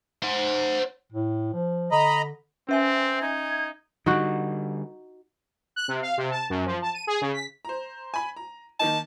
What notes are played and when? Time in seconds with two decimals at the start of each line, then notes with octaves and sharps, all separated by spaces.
0.23 C5 F#5
1.12 A2
1.53 F3
1.92 D3 D#5 A#5 B5
2.69 C4 C#4 E5 G#5
3.22 D#4 G#6
4.06 D3 G3 D#4 F#4
5.76 F#6
5.88 C3
6.02 F5
6.18 C3
6.31 A5
6.50 F#2
6.66 F3
6.82 A5
6.94 D#7
7.07 G#4
7.21 C#3
7.33 B6
7.65 C5 A#5
8.14 G#5 B5
8.36 A#5
8.80 D#3 A#3 D#4 A5